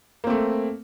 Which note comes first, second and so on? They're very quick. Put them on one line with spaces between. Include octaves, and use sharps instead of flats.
A#3 C4 A3